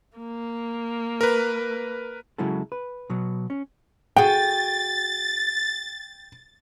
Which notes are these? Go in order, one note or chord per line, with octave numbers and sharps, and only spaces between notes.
A#3
A#4 B4
C#3 F#3 G#3 E4 F#4 A4
B4
B2 F#3 B3
C#4
F#4 G#4 G5 A6